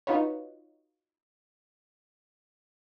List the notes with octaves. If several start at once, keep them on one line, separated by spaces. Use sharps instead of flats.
D#4 F4 F#4 B4 C#5